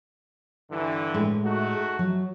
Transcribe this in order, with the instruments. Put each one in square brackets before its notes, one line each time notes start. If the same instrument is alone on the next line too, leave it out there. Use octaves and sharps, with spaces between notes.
[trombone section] G2 D3 E3
[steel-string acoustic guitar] A2 G#3
[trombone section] A3 D#4 F#4
[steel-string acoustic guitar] F#3